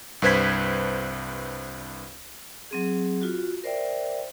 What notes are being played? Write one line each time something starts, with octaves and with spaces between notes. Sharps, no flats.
C2 G2 B4 C5 G#6 B6
F#3 C4 G#4
F4 F#4
A#4 C5 D5 E5 G5